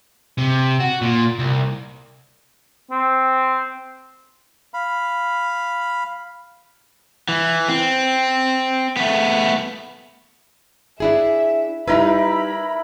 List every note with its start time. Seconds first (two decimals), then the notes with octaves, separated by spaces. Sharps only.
0.38 C3
0.80 F#4
1.01 A#2
1.39 C2
2.91 C4
4.74 F5 B5
7.29 E3
7.69 C4
8.97 A3 B3
11.00 D4 E4 G#4 E5
11.88 G3 D#4 E4 A#4 B4 B5